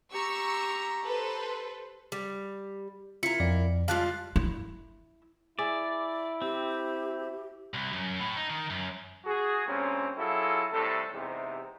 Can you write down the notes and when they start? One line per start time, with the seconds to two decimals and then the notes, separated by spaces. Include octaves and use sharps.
0.12 G4 A#5 C#6 E6
1.05 A4 B4 C5
2.12 G3
3.23 E4 F4 A#4 C#7
3.40 F2 D5
3.88 G3 G#3 F4 F5 A5 F#6
4.36 E4
5.59 E4 G#4 D5 E5
6.42 C4 G4
7.74 C2
7.93 F#2
8.19 A2
8.36 D#4
8.50 D#3
8.70 F#2
9.25 F#4 G#4
9.67 G2 A#2 C4 C#4
10.18 F#3 E4 F4 G#4 A4
10.72 A2 C3 G3 A4
11.13 E2 G#2 C3